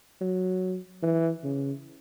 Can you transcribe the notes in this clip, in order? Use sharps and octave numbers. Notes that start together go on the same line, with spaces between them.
F#3
E3
C#3